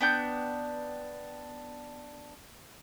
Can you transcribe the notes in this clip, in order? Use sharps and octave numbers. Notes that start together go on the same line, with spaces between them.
B3 D4 G5 G6